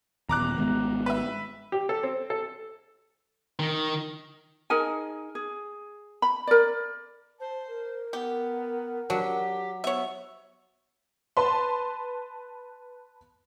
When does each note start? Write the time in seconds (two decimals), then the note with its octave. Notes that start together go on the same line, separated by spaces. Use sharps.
0.29 D#1 E2 A#5 D6 F#6
0.58 G#1 G#3 B3
1.06 B4 E5
1.72 G4
1.89 A4
2.03 C4
2.30 A4
3.59 D#3
4.70 D#4 G#4 A#4 G#5
5.35 G#4
6.22 B5
6.47 A#4 D5
7.40 C5 A5
7.68 A#4
8.13 B3 G4
9.10 F#3 D4 G4
9.84 B3 C#5 E5
11.37 B4 A5 B5 C6